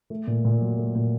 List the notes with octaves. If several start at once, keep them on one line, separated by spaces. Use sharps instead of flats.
A3
A#2
A#2
F#3
A3
A#2